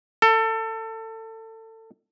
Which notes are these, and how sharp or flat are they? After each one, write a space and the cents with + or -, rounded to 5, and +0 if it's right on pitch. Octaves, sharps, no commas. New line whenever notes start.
A4 +25